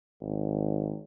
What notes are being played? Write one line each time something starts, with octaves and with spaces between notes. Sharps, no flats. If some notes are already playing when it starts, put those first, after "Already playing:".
G#1